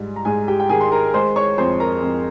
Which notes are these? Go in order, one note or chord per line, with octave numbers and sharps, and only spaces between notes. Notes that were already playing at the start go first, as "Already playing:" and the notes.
Already playing: G#2 G3
A#5
G#2 G#4 G#5
G4 G5
G5
D#3 G#4 G#5
C6
A#4 A#5
G#3 C5 C6
C#5 C#6
F2 C5 C6
A#4 A#5
F2